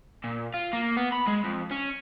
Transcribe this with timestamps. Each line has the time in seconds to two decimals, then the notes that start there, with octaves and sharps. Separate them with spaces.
0.24 A#2
0.54 F4
0.73 A#3
0.97 B3
1.12 B5
1.28 G#3
1.45 F2
1.71 C#4